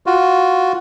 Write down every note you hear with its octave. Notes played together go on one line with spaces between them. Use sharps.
F4 F#4